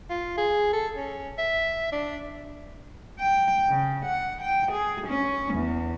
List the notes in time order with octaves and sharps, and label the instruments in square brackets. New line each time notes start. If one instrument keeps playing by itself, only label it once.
[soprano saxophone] F4
G#4
A4
C#4
E5
D4
[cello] G5
C#3
F#5
G5
G#4
C#4
E2